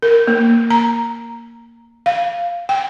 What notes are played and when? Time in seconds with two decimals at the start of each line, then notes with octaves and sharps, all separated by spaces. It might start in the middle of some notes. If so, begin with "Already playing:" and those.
0.03 A#4
0.28 A#3
0.70 A#5
2.06 F5
2.69 G5